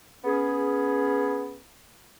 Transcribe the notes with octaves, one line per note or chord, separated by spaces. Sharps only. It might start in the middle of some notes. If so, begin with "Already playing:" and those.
B3 C#4 G#4